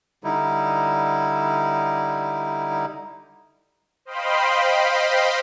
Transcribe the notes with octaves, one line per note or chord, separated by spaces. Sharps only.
D3 G3 D#4 E4
C5 D#5 F5 G5 B5 C6